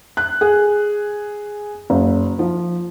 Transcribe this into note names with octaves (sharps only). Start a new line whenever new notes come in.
F#6
G#4
F#1
F3